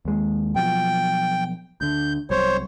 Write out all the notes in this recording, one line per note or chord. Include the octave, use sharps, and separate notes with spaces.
D#2 G#3
B2 F3 F#3 G5
D2 D3 G6
C2 F#3 C5 C#5